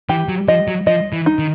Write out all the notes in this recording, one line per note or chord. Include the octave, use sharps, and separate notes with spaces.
E3 G4
F#3
F3 D#5
F#3
F3 D#5
E3
D#4
D#3